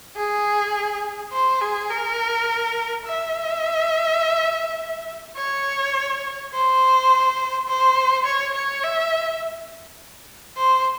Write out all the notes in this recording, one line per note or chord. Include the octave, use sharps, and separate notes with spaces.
G#4
C5
G#4
A#4
E5
C#5
C5
C5
C#5
C#5
E5
C5